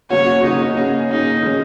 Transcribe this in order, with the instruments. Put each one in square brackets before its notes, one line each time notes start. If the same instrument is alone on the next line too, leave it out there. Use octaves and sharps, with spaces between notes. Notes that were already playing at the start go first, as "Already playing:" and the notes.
[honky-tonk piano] C#3 F#3 A#3 C#4 F#4 [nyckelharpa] C#5
[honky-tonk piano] C#3 F#3 A#3 C#4 F#4 [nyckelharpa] D#4
[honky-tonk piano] A#3 C#4 G#4
[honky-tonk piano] A#3 C#4 G#4 [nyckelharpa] D#4
[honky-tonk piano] D#3 G#3 C#4